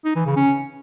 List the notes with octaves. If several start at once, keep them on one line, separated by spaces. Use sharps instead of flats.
D#4
E3
C#3
C#4